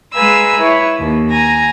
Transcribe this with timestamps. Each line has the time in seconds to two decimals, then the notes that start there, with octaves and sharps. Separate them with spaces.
0.14 G#3 B4 F5 G#5 A#5 E6
0.58 E4 B4 C#5
0.99 D#2
1.30 G#5 A#5 A#6